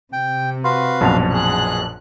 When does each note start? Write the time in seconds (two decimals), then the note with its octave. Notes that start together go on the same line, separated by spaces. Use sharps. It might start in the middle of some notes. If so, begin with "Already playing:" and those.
0.13 C3 G5
0.64 F#4 B4 F5 C6
1.01 A#1 F#2 B2 A5 F7
1.34 G#4 F#6